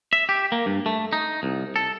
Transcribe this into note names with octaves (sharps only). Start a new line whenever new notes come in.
E5
G4
A#3
G2
A3
D#4
C2
A4